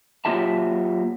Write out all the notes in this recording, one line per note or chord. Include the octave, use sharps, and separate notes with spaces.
F#3 A#3 F4 G4 E5 A5